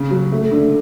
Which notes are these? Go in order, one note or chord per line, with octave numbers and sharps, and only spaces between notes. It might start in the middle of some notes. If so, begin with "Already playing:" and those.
Already playing: C#3
F#3
A3
D3